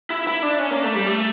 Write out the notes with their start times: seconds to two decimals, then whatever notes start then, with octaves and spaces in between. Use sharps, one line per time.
0.10 E4
0.27 E4
0.43 D4
0.59 C#4
0.71 A#3
0.83 A3
0.95 G3
1.07 A3